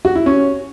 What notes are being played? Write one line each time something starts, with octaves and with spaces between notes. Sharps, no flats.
F#4
E4
C#4